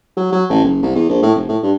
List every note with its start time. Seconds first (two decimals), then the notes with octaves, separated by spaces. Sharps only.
0.17 F#3
0.33 F#3
0.49 A1
0.64 F#1
0.82 C2
0.95 E2
1.09 A#1
1.23 A2
1.36 F1
1.49 A2
1.63 G2